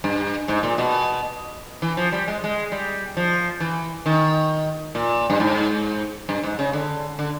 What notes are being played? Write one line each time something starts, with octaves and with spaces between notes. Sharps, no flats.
G2
G#2
A#2
B2
E3
F3
G3
G#3
G#3
G3
F3
E3
D#3
A#2
G2
G#2
G2
G#2
C#3
D3
D3